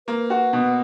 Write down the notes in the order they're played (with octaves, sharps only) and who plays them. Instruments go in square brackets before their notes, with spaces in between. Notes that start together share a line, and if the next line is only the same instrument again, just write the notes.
[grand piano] A#3 [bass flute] B4
[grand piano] F#4
B2